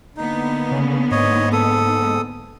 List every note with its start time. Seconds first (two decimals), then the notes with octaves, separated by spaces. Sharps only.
0.17 D3 A#3 B3 D#4
0.71 C#3
1.11 G#2 C#5 D#5
1.52 A4 D#6